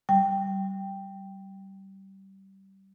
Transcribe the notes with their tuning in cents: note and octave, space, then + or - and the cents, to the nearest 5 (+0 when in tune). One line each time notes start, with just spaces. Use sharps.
G3 -25 G5 +0